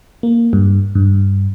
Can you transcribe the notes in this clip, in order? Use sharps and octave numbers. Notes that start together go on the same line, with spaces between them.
A#3
G2
G2